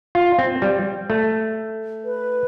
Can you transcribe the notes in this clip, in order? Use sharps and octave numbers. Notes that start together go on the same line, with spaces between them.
F4
C4
G3
A3
B4